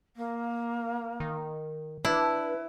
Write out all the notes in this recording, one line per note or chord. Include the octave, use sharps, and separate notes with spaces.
A#3
D#3
D4 E4 B4